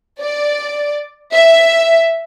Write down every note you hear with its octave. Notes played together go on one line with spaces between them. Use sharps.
D5
E5